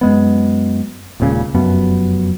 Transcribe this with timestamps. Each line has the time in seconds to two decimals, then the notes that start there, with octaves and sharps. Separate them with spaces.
0.01 F#2 G#3 B3
1.20 D#1 C#2 A#2 C#3
1.54 F1 F#2 B3